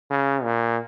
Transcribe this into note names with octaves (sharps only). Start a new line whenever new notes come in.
C#3
A#2